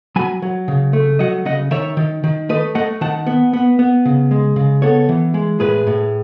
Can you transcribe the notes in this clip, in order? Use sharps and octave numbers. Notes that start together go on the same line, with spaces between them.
F#3 G#5 B5
F#3
C#3
A3
F#3 D#5 F#5
C#3 D#5 F#5
D#3 C#5 E5
D#3
D#3
A3 B4 D#5
A3 D#5 F#5
D#3 F#5 A5
B3
B3
B3
C#3
G#3
C#3
B3 A4 C#5
E3
G#3
A2 G#4 B4
A2